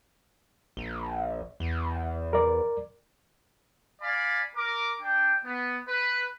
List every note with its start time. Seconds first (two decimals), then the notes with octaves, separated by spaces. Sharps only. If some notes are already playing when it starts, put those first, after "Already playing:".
0.77 A#1
1.60 E2
2.33 A#4 D5
4.02 D5 F5 G#5 B5
4.56 A#4 D6
5.01 D4 G5
5.45 B3
5.88 B4